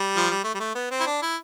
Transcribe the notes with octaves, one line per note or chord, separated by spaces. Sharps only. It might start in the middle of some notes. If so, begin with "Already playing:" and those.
Already playing: G3
F3
G3
A3
G3
A3
B3
C4
E4
D4
E4